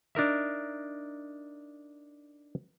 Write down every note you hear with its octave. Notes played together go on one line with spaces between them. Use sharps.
D4 D#4 A#4 E5